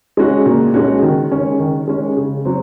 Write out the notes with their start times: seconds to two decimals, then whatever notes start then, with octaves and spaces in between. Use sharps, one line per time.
0.17 G#3 C#4 F#4
0.46 A#2
0.74 G#3 C#4 F#4
1.02 D#3
1.31 G#3 C#4
1.59 D#3
1.87 G#3 C#4
2.16 C#3
2.45 F#3 C4